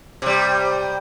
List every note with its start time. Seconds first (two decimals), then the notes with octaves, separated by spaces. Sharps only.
0.22 C3 G3